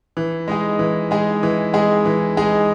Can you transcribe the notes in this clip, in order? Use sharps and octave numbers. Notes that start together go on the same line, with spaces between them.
E3
G#3 D#4 G#4
E3
G#3 D#4 G#4
E3
G#3 D#4 G#4
E3
G#3 D#4 G#4